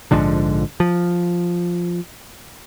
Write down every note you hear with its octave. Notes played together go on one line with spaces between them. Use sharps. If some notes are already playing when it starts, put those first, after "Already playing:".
A#1 G#2 D3 F3
F3